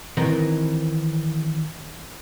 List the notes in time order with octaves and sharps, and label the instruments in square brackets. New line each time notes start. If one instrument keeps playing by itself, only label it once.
[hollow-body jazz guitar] D#3 E3 C4 A#4 B4